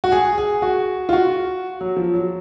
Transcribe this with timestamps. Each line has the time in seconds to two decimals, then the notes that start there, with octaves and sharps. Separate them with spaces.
0.04 F#4
0.12 G#4
0.38 G#4
0.62 F#4
1.09 F4
1.13 F#4
1.81 F#3
1.97 F3
2.14 F#3